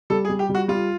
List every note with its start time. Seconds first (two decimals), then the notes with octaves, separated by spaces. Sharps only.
0.10 G3 A4
0.25 G#4
0.29 G3
0.39 G4
0.49 G3
0.54 F#4
0.68 G3 F4